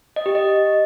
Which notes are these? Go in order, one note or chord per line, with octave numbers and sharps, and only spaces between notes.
D#5
G4
D#5